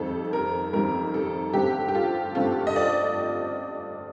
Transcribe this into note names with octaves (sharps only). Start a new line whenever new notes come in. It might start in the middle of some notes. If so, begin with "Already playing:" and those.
Already playing: F2 D#3 G3 C4 A4
A#4
F2 D#3 G3 C4 A#4
A4
G2 D3 A3 C4 G4
G4
F4
G2 D3 A3 C4 F4
D#5
D5